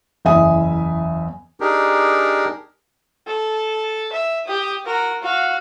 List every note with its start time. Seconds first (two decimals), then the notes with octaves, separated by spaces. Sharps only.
0.25 F#1 E2 E5 G#5 D#6
1.60 D4 D#4 G4 G#4 A#4
3.27 A4
4.12 E5
4.46 G4 D#6
4.85 F#4 A#4
5.21 F#4 F5